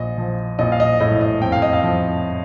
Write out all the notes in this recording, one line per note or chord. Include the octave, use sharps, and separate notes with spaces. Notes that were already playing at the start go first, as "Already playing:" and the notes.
Already playing: A#1 D#5
F3
A#1 D#5
F5
D#5
A2 D#5
D#5
F2 G5
F5
D#5
F5
F3